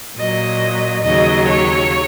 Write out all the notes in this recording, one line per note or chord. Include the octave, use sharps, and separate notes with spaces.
A#2 F#3 D#5
D#2 C#3 F#3 D#5
C#5